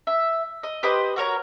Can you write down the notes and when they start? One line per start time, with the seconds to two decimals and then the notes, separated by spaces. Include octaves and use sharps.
0.07 E5
0.63 D#5
0.83 G4 B4 C5 D#5
1.16 F#4 A#4 C#5 A#5